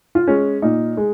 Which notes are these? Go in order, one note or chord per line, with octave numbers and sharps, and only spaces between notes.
F4
G#3 C#4
A#2 D#4
G#3